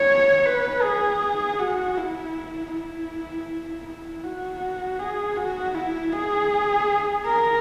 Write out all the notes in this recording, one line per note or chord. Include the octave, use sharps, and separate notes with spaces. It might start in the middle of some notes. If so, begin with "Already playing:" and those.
Already playing: C#5
B4
G#4
F#4
E4
E4
E4
F#4
G#4
F#4
E4
G#4
A#4